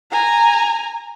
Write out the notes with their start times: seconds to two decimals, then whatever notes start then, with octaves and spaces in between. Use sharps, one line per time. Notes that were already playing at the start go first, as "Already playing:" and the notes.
0.12 G#5 A#5